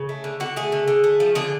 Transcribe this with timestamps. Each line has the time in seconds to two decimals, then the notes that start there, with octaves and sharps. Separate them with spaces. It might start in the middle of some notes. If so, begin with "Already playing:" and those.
Already playing: C#3
0.09 A3
0.24 D3
0.40 D3 F#4
0.56 A3 G#4
0.72 D3
0.88 D3
1.04 A3
1.20 F3
1.35 D3 G#4